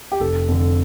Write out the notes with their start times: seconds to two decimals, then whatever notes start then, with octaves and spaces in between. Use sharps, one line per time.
0.12 G4
0.20 F1 A4
0.48 F2 D3